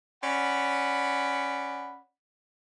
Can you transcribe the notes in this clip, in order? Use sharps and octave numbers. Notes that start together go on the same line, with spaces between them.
C#4 D5 F#5 B5